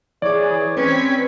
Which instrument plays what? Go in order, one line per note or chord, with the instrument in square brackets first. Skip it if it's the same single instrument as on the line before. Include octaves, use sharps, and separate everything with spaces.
[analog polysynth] E3 G#4 [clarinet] C#5 [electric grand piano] D5 D6
[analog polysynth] C4 G#6 B6 [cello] C#4 [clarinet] B4